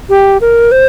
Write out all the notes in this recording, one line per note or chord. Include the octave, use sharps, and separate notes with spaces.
G4
A#4
C5